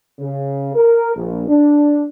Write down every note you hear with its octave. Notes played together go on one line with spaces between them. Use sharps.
C#3
A#4
A#1
D4